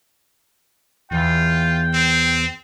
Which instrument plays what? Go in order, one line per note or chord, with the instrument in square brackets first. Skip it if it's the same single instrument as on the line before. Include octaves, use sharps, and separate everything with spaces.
[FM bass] E2 [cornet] F4 [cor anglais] G5
[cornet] C4